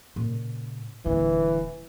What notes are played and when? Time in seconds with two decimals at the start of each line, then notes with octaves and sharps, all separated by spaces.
0.16 A#2 C#3
1.06 D#1 D3 E3